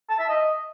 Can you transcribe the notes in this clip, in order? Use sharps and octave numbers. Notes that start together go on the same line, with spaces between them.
A5
E5
D#5